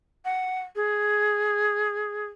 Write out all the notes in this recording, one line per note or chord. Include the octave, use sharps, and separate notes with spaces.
F#5
G#4